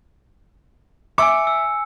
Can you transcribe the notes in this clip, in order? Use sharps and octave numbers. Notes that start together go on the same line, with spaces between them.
E5 G#5 D6 E6 C#7
E6